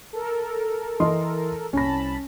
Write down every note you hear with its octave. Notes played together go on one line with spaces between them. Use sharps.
A4 A#4
E3 D#5 C6
C2 C#4 A5 B5 A#6